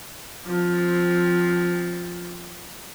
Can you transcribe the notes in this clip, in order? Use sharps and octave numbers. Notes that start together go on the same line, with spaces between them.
F3 C4